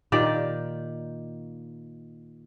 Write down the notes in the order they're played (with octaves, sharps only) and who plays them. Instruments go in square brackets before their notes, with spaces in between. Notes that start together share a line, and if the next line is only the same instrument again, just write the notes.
[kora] A#2 D#3 G4 D5